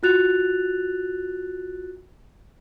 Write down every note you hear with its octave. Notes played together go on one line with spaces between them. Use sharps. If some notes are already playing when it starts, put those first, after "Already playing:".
F4 F#4 F#6 A6 F7